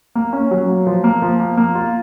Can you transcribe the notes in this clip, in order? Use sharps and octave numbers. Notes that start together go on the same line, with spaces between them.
A#3
C#4
F#3
A#3
F3
A#3
F3
A#3
A#3
F4